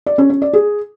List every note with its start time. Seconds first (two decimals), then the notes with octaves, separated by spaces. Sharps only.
0.06 D5
0.18 C#4
0.30 C#4
0.42 D5
0.53 G#4